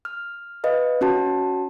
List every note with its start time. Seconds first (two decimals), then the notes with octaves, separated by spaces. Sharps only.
0.05 F6
0.64 B4 D#5 F5
1.01 C#4 F#4 A5